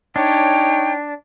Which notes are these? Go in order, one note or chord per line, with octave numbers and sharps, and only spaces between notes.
D4 D#4 C#5 G5